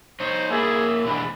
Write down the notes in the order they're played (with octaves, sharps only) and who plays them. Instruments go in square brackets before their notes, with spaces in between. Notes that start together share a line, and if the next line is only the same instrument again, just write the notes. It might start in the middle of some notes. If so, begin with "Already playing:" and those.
[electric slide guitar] D#4 C#5 [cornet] C5
[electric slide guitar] A#3 E4 [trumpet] G#4 [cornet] E5
[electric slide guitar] B2 E3 D4 [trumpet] B5